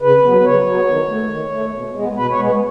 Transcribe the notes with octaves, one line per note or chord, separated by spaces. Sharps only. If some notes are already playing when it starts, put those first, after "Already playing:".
C#3 B4
F#3 B3
B4
C#3 C#5
F#3 B3
D#3
A3
D#3
A3
B2
G#3 B3
B2 B4
C#5
G#3 B3